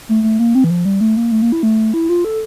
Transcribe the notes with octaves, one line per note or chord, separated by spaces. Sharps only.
A3
A3
A#3
C4
E3
F3
G3
A3
A#3
A3
A#3
E4
A3
E4
F4
A4